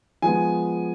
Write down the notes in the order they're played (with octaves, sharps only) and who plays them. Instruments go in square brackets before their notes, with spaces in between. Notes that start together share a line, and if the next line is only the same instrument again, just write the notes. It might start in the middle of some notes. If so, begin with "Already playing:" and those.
[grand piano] F3 G#3 B3 G#5